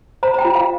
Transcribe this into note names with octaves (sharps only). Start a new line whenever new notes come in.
C5 A#5
A#5
G5
F4
F5